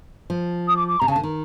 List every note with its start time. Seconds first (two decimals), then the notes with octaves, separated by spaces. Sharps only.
0.30 F3
0.68 D#6
0.76 D6
0.88 D6
1.00 C3 A#5
1.07 C#3 G#5
1.11 A5
1.16 D3
1.23 D#3